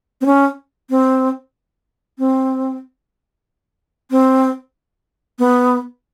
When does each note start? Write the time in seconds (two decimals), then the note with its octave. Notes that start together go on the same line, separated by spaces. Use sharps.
0.21 C4
0.26 C#4
0.90 C4
2.19 C4
4.11 C4
5.39 B3